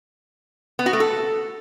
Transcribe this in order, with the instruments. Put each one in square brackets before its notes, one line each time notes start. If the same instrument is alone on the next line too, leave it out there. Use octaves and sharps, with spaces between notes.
[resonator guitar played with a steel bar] B3
F#4
A3
A4